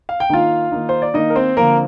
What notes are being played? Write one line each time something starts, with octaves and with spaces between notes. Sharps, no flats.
F5
G5
D#3 A#3 D#4 F4 F5
D#3 A#3 D#4
C5
D5
D#3 A#3 D#4 D#5
A#4
C4 C5
D3 F3 A#3 C4 A#4